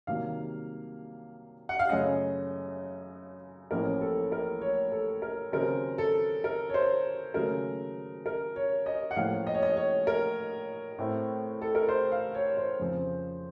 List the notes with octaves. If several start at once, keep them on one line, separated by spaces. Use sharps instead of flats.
C2 C3 D#3 F#3 A#3 F5
F#5
F5
F#2 C#3 A3 C#4 D#5
A1 A2 F3 A#3 C#4 A#4
A4
A#4
C#5
A4
A#4
D#2 C#3 F#3 C4 A#4
A4
A#4
C#5
C5
D#2 C#3 F#3 A3 A#4
A#4
C#5
D#5
F#5
A2 F3 A#3 C#4 F5
D#5
C#5
D#5
C#5
A#4
A2 A3 C4
A4
A#4
C5
F5
C#5
C5
F2 C#3 F3 C4